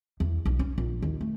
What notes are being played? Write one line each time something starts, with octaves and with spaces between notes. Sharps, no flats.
E2
B1
C#4
A#1
D#2
A3